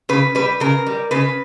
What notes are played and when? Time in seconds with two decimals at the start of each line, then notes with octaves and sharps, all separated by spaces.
0.09 C#3 B4
0.35 G3 B4
0.60 C#3 A#4
0.86 G3
1.11 C#3 B4